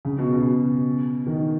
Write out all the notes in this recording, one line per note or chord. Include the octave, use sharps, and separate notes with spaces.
C#3
B2
B2
D#3